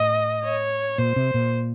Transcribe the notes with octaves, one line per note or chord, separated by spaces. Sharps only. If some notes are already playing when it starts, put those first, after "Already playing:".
Already playing: A2 D#5
C#5
A#2 C5
C3
A#2